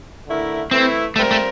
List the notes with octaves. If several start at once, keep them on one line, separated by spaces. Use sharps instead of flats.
D3 A3 E4 A#4
E3 A3 C4 E4
G3 A3 C4 F4 A#4
A3